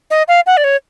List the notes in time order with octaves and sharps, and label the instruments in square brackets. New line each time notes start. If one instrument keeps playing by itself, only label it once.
[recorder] D#5
F5
F#5
D5
C#5